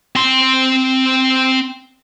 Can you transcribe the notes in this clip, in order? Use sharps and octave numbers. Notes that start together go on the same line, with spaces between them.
C4 C6